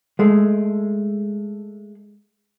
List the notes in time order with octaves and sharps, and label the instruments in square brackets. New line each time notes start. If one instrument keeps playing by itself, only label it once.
[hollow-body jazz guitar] G#3 A3